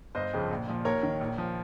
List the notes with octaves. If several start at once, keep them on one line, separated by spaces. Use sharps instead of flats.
G1 C5 D#5
F2 C#3 F3
A#1
A#2 F3
D#2 A#4 C#5
D#3
A#1
F3